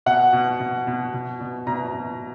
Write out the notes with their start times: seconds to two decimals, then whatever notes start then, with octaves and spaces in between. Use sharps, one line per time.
0.06 B2 F#5
0.33 B2
0.60 B2
0.87 B2
1.14 B2
1.40 B2
1.67 B2 A#5
1.94 B2